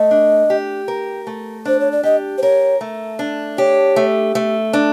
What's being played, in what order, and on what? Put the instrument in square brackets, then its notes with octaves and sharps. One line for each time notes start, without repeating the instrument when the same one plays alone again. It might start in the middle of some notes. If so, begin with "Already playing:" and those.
Already playing: [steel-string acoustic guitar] A3 [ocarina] D#5
[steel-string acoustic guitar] D4
G4
A#4
A3
[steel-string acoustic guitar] D4 [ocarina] C5
[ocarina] C#5
D5
[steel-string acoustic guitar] G4 [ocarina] D#5
[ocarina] C5
[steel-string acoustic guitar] A#4 [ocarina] C#5
[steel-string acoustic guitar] A3
D4
[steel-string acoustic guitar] G4 [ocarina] C#5
[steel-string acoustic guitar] A3
A3
D4